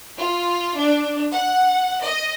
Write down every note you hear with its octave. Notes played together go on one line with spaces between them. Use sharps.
F4
D4
F#5
D#5